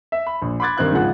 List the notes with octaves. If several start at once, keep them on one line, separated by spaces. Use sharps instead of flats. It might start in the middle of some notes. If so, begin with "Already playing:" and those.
E5
B5
A#1
B5 C6 D6 F#6 G#6 A6
G2 D#3 C4 D#4 F#6 G#6
C#2 G#2 F3 G#4 F#5 F#6